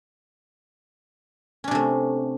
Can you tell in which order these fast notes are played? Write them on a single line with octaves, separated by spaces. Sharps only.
C#4 D4 C3 A3